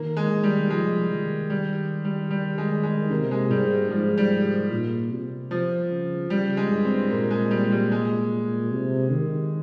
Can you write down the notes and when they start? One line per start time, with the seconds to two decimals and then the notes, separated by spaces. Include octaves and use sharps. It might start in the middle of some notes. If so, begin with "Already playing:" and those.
Already playing: D#3 A#3
0.17 G#3
0.30 D#3
0.44 G3
0.70 F3 G#3
1.11 D#3
1.50 G3
2.05 G3
2.31 G3
2.58 G#3
2.83 G#3
3.10 C3 A#3
3.31 G#3
3.50 G#2 G3
3.90 G#2 F3
4.18 G3
4.71 A#2
5.11 C3
5.51 F3
5.90 C#3
6.30 C#3 G3
6.57 G#3
6.70 G2
6.85 C4
7.11 A#2 A#3
7.31 G#3
7.51 G3
7.72 G3
7.92 G#3
8.71 C3
9.12 D#3